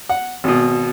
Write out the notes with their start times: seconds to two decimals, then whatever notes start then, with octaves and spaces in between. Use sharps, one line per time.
0.09 F#5
0.44 G#1 B2